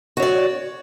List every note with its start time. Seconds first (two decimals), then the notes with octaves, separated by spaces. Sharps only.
0.17 F#4
0.20 C#5
0.22 D5